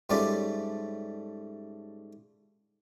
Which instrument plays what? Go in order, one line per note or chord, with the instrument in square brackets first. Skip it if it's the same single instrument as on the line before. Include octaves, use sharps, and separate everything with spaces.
[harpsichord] G#2 G3 A3 C#4 F4 D5